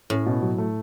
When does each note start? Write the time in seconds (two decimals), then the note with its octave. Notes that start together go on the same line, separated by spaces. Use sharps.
0.10 A2 C#4
0.26 B2
0.42 F#3
0.58 A3